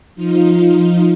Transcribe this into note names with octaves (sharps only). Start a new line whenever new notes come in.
F3 D#4 F4